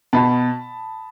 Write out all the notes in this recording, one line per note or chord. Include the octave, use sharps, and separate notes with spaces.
B2 A5 B5